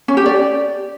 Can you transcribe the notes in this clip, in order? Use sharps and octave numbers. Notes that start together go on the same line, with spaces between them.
C#4
G4
D5